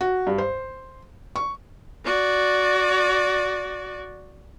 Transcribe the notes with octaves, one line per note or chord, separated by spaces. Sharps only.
F#4
G2
C5
C#6
F#4 D5